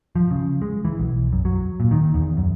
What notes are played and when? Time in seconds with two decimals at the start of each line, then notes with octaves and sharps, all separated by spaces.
0.16 F3
0.31 C#3
0.62 G#3
0.85 E3
1.00 B1
1.33 F#2
1.45 F#3
1.80 A#2
1.91 D#3
2.14 E2
2.37 F#2